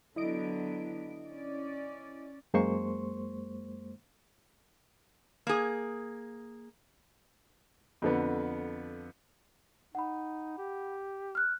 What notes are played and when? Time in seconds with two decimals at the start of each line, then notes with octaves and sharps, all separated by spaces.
0.16 D3 F#3 B3 E4 D#5 D7
1.26 C#4 D5
2.54 F#2 G#3 A#3 C5 C6 C#6
5.47 A#3 G#4
8.02 F2 D3 B3
9.95 D#4 F#5 B5
10.59 G4
11.35 F6 F#6